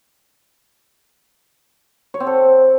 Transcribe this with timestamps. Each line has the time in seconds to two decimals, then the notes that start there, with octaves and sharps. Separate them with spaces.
2.14 C#5
2.20 C4
2.27 A4